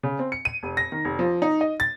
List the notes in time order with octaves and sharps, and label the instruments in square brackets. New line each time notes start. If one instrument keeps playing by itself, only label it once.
[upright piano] C#3
C4
C#7
D#7
F1
A#6
D#3
F1
F3
D#4
D#5
A6